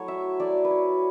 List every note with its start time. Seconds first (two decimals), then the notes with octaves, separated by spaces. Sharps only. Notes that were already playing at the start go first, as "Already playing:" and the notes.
Already playing: F#3 A3 E4 C#5
0.08 E5
0.40 F#3 A3 E4 D5
0.65 B4
0.71 C#5